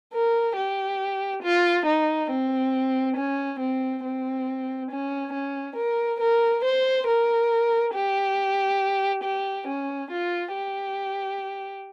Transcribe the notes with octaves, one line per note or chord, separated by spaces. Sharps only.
A#4
G4
F4
D#4
C4
C#4
C4
C4
C#4
C#4
A#4
A#4
C5
A#4
G4
G4
C#4
F4
G4